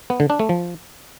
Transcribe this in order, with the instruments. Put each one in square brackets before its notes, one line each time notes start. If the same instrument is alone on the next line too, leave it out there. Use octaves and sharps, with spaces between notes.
[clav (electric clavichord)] B3
D3
D4
A3
F3